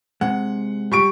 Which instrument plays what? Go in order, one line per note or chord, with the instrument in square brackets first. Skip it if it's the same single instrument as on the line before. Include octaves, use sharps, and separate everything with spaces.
[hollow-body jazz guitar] C3 G#3 [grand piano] F#5
[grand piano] G3 C#6 D7